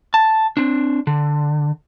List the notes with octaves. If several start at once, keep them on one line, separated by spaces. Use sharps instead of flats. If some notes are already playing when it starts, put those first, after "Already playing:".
A5
C4 D4
D3